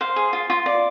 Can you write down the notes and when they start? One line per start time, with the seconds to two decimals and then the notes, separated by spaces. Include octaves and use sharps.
0.01 C5 F5
0.16 G#4
0.33 F4
0.50 F4
0.66 D5